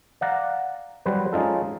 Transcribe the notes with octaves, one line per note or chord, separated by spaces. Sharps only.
D5 F5 F#5 A#5
F#3 G3 B4 C5
G#3 C#4 D#4 F4 A4